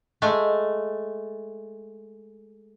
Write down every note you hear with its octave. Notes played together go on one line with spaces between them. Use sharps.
G#3 A3